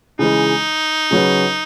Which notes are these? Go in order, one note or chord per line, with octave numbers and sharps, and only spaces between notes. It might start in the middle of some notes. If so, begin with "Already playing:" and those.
C#3 E3 G#3 D#4
C#3 F#3 C#4 G#4 B4